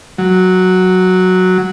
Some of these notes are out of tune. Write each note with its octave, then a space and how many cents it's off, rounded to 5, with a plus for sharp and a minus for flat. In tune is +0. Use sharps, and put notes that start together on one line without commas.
F#3 +0